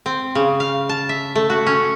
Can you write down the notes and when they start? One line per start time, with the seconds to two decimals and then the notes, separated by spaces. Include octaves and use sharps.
0.06 C4
0.35 C#3
0.60 F5
0.89 A5
1.09 E5
1.35 A3
1.50 F#4
1.67 C#4